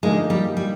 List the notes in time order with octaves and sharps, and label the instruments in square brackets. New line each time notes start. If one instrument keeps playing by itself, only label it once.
[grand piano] D3 F3 A#3 D#4 [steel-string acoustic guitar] G#3
[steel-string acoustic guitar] G3
G3